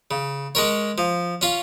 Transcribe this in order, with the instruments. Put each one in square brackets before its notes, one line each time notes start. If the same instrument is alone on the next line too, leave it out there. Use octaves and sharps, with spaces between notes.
[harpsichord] C#3
G#3 C#4 A#4 C#5
F3
C#4 F4 C#5